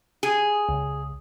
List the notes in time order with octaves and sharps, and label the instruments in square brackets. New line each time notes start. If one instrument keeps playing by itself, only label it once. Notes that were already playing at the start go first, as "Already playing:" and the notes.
[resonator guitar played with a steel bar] G#4
[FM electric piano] C#2